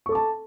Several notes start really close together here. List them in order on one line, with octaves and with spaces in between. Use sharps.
C#6 A4 D6 A5